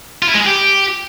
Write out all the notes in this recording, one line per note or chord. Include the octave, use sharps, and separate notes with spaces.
F4
E4
G#3
G#4
G4